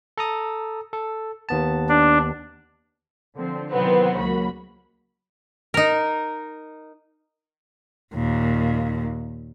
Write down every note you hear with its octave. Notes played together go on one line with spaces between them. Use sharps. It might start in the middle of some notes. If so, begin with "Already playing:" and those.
A4 A#5 D#6
A4
D#2 B3 A5
D4
D3 F3 C4
C3 D#3 E3 F#3 B3 C4
C#2 F#3 A#3 F#4 B5
D#4 A#4
D#2 A#2